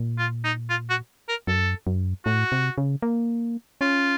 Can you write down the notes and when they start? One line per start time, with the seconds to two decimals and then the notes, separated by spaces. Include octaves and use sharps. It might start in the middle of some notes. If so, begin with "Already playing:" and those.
Already playing: A#2
0.18 F4
0.44 D#4
0.70 F4
0.90 F#4
1.28 A#4
1.47 F#2 A4
1.87 F#2
2.25 A2 F#4
2.52 C3
2.78 C#3
3.02 A#3
3.81 C#4 F4